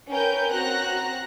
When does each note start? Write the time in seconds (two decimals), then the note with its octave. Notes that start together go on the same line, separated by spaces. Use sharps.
0.11 C#4 A#4 B4 G5 G6
0.52 C4 F#4 A#5 F#6 A#6